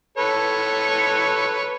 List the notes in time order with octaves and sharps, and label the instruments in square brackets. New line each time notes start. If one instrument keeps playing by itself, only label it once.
[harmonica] A4 B4 C#5